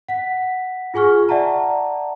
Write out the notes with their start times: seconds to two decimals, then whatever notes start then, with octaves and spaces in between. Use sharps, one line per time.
0.09 F#5 B6
0.94 F4 G#4 G#5 C#6 F6
1.29 D5 E5 F#5 A5 A#5